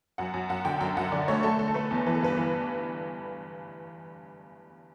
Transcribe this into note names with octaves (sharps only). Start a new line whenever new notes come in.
F#2 F#5
F#2
F#2 F#5
D3 G5
F#2 G5
F#2 F#5
D3 D5
A3 C#5
A3 A4
A3
A4
A3 B4
E2
E3 B4
A4
G2 B4
E3